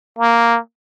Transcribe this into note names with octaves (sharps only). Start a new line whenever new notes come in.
A#3